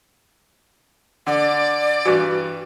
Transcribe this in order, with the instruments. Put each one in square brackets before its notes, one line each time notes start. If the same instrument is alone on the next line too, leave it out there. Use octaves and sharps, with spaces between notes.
[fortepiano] D3 [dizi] D5
[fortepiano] G2 E3 [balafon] F#4